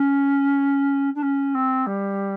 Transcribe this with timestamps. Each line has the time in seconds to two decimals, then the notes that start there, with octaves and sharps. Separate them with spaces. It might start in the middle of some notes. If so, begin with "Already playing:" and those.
Already playing: C#4
1.15 D4
1.22 C#4
1.55 C4
1.86 G3